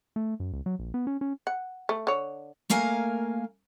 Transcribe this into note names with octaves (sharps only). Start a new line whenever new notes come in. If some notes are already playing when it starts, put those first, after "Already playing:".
A3
F#2
C#2
F#3
A#1
B3
C#4
C#4
F#5
A3
D3 C#5
A3 A#3 A#4 F5 G#5